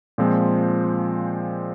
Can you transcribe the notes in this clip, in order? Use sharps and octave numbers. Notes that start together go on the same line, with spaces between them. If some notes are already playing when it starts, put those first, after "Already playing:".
A#2 F3 G#3 C4